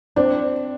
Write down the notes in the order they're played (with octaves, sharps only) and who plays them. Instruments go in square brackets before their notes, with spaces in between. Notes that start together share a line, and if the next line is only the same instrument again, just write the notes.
[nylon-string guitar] C4 [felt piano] D4